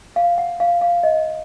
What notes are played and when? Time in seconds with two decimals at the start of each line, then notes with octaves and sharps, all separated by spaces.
0.16 F5
0.38 F#5
0.60 F5
0.81 F5
1.03 D#5